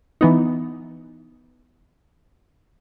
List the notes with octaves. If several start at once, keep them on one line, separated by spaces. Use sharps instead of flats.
E3 B3 D#4